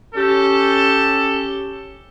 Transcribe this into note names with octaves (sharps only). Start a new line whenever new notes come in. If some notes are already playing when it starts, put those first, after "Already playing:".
C#4 G4 A4